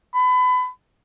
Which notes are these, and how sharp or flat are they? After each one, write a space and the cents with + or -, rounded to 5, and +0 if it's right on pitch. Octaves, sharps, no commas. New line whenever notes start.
B5 +30